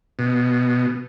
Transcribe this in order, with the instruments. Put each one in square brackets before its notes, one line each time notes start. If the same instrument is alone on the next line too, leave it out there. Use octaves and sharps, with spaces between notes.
[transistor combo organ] B2